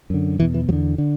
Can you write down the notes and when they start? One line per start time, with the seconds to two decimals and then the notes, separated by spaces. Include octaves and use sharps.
0.10 F#2 D3
0.39 E2 B2 E3
0.54 E3
0.69 E2 D3 F#3
0.98 D3